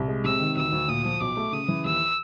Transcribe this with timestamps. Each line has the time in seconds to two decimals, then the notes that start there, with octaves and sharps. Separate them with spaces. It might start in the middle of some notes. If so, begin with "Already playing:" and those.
Already playing: C2
0.08 G#3
0.24 C3 E6
0.40 D#3
0.56 D2 E6
0.72 D2
0.88 A#2 D#6
1.05 F3
1.21 B1 D6
1.37 A3
1.52 C#3 D#6
1.68 E3
1.85 D#2 E6